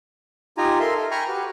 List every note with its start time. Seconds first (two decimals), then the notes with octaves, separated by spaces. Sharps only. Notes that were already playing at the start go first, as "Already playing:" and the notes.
0.58 D#4 F4 G4 G#5 A#5
0.80 A4 A#4 E5 C6
0.96 A4
1.11 G5 G#5 A#5 B5 C#6 F6
1.28 F#4 G4 B4